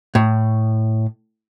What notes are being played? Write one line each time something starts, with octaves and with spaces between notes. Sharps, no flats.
A2